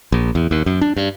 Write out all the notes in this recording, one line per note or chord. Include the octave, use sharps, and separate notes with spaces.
A#1
E2
D#2
F#2
D4
G2